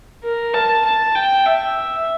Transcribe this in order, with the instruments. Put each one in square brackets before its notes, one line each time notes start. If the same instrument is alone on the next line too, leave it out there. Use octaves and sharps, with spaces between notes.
[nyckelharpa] A#4
A5
A5
G5
E5